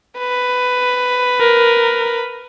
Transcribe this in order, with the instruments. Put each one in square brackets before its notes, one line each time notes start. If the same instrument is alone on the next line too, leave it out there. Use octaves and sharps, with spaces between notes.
[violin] B4
[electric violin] A#4